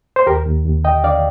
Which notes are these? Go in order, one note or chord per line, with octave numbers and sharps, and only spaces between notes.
C5
D#2 G4 A#4
D#2
D#2
D3 D#5 G5
D3 D5 F5